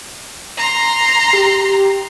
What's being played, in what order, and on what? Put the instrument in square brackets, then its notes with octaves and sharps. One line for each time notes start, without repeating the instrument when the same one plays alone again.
[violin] A#5 C6
[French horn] G4